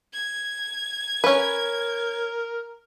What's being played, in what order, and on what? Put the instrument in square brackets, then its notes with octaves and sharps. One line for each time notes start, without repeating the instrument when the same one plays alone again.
[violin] G#6
[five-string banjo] C#4 B4 [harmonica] A#4